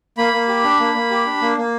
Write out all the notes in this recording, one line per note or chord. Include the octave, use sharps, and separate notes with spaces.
A#3 B5
A#3
G4
D4
A#3
A#3
G4
D4
A#3
A#3